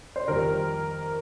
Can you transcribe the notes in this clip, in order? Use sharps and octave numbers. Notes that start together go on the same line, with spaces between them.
C5
F2 D#3 G3 A#4